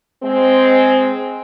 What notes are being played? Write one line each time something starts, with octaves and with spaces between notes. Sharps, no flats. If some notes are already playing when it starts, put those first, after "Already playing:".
G#3 C4